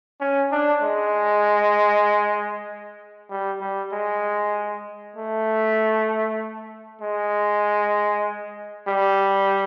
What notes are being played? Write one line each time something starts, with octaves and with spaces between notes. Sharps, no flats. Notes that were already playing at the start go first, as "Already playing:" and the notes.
C#4
D4
G#3
G3
G3
G#3
A3
G#3
G3